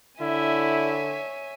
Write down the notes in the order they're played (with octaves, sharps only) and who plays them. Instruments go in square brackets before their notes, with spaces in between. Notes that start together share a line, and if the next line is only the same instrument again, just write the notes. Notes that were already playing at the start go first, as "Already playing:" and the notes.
[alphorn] D3 [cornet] E4 [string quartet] C#5 E5 G#5